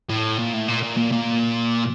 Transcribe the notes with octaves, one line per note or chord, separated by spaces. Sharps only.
A2
A#2
A2
A#2
A#2
A#2
A#2